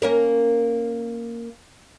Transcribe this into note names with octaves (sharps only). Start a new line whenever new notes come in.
A#3 C#4 A#4